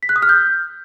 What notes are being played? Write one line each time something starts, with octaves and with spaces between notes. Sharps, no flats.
B6
F#6
D#6
F6
G6